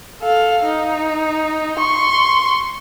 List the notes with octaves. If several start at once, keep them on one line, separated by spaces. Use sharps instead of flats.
A4 F5
D#4
C6 C#6